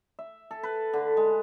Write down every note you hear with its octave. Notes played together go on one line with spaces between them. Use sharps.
E5
A4
B4
D3
G#3